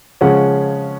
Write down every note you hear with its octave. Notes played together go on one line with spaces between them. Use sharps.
C#3 F3 G#3 C#4 F#5